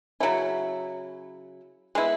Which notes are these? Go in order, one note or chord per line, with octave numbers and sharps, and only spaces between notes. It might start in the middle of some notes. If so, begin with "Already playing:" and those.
C#3 F#3 C#4 E4
G#3 B3 E4